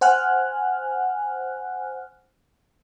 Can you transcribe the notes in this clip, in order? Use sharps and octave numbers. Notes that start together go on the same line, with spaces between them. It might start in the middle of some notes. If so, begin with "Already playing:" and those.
C5 F#5 G#5 F6 F#6